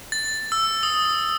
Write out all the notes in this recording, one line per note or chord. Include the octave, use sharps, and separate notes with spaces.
A6
E6
D#6